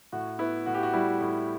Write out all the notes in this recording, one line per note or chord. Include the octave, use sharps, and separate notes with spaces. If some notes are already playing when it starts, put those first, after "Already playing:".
A2 F#4
B3 E4
A2 F#4
G4
F#4
G3 E4
A2